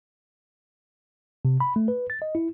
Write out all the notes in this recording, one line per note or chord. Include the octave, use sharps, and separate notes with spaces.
C3
B5
A3
B4
A6
D#5
E4